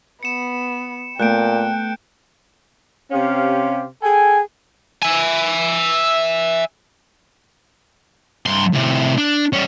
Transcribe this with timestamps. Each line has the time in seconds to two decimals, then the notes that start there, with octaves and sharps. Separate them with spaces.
0.23 B3 C#7 E7
1.20 A#2 A3 B3 G5 F#6 G6 D7
3.11 C3 C#4 G4 C5 F5
4.02 G#4 A4 G5 G#5
5.03 E5 G#5
8.46 G2 C6
8.74 A2 C3
9.18 D4
9.53 G3 C#4